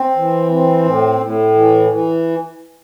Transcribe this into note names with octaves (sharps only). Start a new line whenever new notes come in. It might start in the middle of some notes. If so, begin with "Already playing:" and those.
Already playing: C4
E3
C4
A2
A2
E3
E3